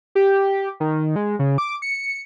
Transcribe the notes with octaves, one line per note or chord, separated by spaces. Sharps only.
G4
D#3
G#3
C#3
D6
C#7